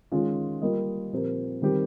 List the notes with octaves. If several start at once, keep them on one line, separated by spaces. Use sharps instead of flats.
D#3 G#3 C#4 F4
G3 A#3 F4 A#4 D#5
A#2 F3 C4 G4 A#4
D#3 G3 C4 G4 A#4